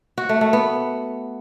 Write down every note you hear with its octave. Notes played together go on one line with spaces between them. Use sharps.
F#4
A3
A3
B3